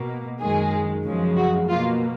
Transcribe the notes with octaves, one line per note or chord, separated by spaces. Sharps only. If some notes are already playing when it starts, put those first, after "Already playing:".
Already playing: B2 A#3
F#2 D#3 G#3 G#4
F#2 C#3 F3 G#3
F#4
B2 A#3 F4